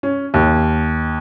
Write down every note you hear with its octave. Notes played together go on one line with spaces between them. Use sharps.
C#4
D#2